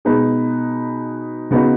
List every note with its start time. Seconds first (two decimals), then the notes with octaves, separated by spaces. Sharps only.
0.05 B2 G#3 D#4 G#4 B4
1.51 C#3 B3 D#4 F#4 B4